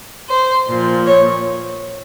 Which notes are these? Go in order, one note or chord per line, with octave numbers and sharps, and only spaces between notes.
C5
A#2 F3
C#5